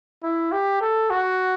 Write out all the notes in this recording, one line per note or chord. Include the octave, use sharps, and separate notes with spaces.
E4
G4
A4
F#4